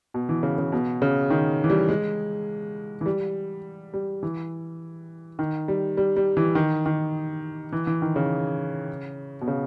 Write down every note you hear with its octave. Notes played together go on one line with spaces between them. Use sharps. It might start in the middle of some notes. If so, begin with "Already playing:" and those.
B2
E3
C#3
C#3
B2
C#3
D#3
E3
G3
G#3
E3
G3
G3
E3
D#3
G3
G3
G3
E3
D#3
D#3
E3
E3
D#3
C#3
B2
C#3